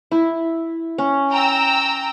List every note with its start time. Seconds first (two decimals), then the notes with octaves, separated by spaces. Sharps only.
0.11 E4
0.98 C#4
1.32 G5 A#5 E6